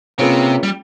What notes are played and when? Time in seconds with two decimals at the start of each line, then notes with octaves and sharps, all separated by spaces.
0.18 C3 A#3 C#4 F4 G#4 B4
0.63 G3